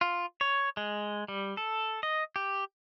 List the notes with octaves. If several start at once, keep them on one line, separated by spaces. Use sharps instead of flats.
F4
C#5
G#3
G3
A4
D#5
G4